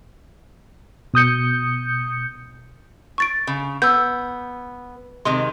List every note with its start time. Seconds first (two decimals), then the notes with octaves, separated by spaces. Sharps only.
1.14 B2 D#6 G6 C#7
3.18 C#6 A6 D7
3.47 C#3
3.82 B3 E6 G6
5.25 C3 D#3 G#3 C6